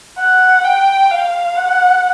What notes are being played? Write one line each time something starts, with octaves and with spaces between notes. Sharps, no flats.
F#5
G5
F5
F#5